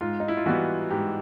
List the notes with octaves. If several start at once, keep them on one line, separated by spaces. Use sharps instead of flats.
G#2 F4
D#4
E4
F4
E3 G3 B3 F#4
G#2 G4